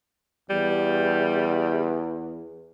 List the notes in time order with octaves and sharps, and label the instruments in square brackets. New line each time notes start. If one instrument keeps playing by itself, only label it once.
[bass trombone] E2 [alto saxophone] G3